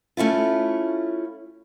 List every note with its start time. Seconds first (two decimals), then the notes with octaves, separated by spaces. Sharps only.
0.17 A3 C#4 E4 F4